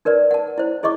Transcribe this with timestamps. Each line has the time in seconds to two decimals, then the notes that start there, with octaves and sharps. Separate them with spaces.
0.05 D#4 A#4 B4 D5
0.31 F#5 A5
0.58 E4 C5
0.83 E4 G#4 D#5 C#6 D6